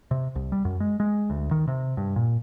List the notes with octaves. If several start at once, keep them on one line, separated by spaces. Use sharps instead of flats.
C3
C2
G3
F#2
G#3
G#3
D2
D#3
C3
G2
A#2